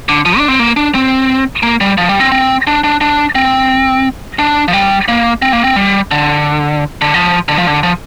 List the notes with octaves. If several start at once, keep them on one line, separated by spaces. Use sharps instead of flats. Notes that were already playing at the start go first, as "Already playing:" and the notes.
D3
F3
D4
C4
A#3
D4
C4
A#3
G3
F3
G3
C4
C4
D4
D4
D4
C4
D4
F3
G3
A#3
C4
A#3
C4
G3
D3
D3
F3
D3
F3
D3
F3